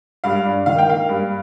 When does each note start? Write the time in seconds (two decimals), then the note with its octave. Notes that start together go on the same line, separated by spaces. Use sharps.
0.24 G2 F5
0.45 D4
0.66 D#3 F5
0.78 G5
0.88 A#3 F5
1.09 G2